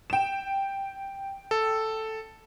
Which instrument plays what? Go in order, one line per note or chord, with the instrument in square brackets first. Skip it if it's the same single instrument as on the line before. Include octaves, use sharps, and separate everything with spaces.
[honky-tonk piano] G5 E7
[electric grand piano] A4